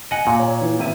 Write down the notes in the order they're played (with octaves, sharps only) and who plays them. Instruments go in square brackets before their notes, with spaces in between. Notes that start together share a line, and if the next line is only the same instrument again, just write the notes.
[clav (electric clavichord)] D#5 F#5 [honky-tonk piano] G#5
[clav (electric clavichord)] A#2
[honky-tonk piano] C#5
E3
G#1 E5 D#7